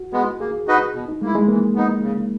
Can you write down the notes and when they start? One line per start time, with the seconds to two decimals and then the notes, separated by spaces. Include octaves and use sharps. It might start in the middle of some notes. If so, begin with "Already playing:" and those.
Already playing: F#4
0.13 G#3 B3
0.40 A#3 G#4
0.67 D#4 F#4 B4 D#5
0.94 B2
1.08 D#4
1.22 G#3 A#3 E4
1.35 G#3
1.48 E3 A#3
1.75 B3 D#4
2.03 C#3